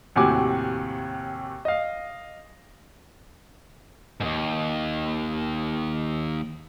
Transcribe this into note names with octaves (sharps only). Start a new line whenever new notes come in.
D#2 A2 C3 F#4 G#5 D6
D#5 F5
D#2 G#2